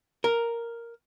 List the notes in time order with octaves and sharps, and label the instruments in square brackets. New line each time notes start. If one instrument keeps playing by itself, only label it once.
[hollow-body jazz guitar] A#4